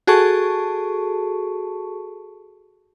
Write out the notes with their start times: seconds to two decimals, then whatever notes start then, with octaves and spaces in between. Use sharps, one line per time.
0.07 F#4 G#4 A4 A5 C#6